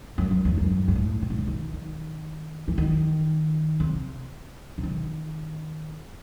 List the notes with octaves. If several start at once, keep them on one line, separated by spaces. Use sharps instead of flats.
F#2
F#2
E2
F#2
G2
G2
A2
B2
A2
B2
D#3
D#3
E3
D#3
C3
C3
D#3